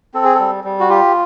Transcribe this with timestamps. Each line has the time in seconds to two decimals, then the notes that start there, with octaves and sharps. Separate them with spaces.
0.14 C4 A4
0.24 G#4
0.35 A4
0.40 G3
0.64 G3
0.80 F#4
0.89 F4 G4